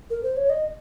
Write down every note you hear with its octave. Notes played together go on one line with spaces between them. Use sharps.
A#4
C5
C#5
D#5